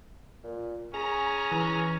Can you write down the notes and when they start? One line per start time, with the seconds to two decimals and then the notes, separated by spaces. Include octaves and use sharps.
0.43 A#2
0.94 C#4 G#4 A#5
1.52 E3